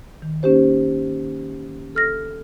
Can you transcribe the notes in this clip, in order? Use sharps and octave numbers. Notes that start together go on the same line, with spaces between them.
D#3
A#3 C#4 D#4 G4 C5
A4 F6 A#6